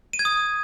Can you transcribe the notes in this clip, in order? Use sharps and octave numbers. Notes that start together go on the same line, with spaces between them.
D#7
G#6
D#6